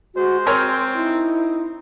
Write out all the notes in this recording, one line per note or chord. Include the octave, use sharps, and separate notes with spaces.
G#3 F#4 C5
C4 A#4 C#5 G#5 C6
D#4 E4